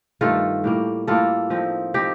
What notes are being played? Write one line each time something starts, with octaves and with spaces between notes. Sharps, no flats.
G2 D#3 A3 F4 A4
A2 G3 A#3
A2 G3 A#3 F4 A4
F3 C4 D#4
F3 C4 D#4 G4